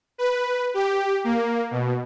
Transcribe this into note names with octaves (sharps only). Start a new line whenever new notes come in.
B4
G4
A#3
B2